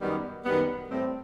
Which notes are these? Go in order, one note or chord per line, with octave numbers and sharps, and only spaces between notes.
F#2 D#3 G3 B3
F#2 D#3 G3 B3
A2 E3 G3 C4